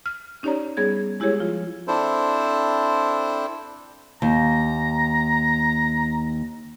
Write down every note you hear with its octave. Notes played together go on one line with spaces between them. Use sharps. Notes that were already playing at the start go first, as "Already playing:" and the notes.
F6
C#4 D#4 G4 C#5 D5 A#5
G3 B3 G#4 C#5 G#6
G#3 E4 G4 G#4 C#5
F3 F4
C4 D4 E4 A4 C5
D#2 A#5